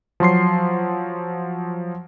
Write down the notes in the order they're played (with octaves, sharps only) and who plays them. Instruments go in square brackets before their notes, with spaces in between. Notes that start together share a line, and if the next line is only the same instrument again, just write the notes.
[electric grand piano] F3 F#3 C6 C7